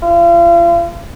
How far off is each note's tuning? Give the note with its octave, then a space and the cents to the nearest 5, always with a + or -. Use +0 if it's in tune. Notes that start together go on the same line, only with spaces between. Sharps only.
F4 -40